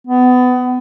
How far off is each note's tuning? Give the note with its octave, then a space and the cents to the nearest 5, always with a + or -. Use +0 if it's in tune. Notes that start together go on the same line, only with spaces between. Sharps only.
B3 +25